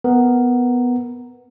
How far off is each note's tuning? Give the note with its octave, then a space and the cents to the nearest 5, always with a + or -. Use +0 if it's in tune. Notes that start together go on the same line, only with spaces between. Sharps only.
B3 +0 A#4 +0